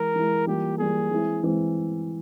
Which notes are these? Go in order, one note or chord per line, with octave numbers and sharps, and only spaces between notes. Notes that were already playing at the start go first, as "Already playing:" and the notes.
Already playing: E3 G#3 E4 A#4
E3 G#3 E4
E3 G3 A#3 F4 G4
E3 G3 A#3 F4 G#4
E3 G#3 C4 E4
E3 G#3 C4 E4